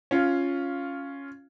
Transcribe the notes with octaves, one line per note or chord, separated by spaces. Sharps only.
C#4 F4